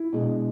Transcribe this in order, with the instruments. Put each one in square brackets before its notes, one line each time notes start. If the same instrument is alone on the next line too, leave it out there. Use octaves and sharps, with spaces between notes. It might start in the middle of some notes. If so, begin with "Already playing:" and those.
Already playing: [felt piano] E4
B2 G#3 D4